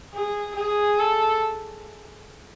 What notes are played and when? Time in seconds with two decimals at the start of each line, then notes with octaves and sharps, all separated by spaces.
0.14 G#4
0.56 G#4
0.99 A4